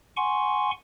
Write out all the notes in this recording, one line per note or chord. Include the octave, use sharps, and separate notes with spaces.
F#5 G#5 C6 C#6